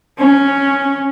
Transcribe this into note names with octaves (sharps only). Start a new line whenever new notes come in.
C#4